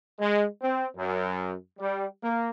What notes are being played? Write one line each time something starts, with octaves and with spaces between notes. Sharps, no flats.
G#3
C4
F#2
G3
A#3